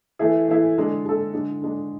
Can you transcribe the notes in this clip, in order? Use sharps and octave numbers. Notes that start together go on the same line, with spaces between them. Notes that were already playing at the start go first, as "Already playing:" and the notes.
E3 A3 E4 G#4
E3 A3 E4 G#4
D3 G#3 D4 A4
D3 G#3 D4 A4
D3 G#3 D4
D3 G#3 D4